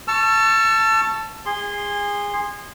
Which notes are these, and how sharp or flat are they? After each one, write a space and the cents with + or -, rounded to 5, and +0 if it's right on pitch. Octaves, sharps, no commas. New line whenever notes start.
A5 +0 C#6 +0 E6 +40
G#4 -25 C6 +0